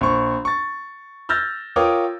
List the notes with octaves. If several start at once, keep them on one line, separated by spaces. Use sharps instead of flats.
A#1 C#6
C#6 A6
E6 F6 G6 A6 A#6
F4 A#4 C#5 G5 D6 D#6